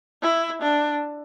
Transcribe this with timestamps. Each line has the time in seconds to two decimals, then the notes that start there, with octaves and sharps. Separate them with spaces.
0.23 E4
0.62 D4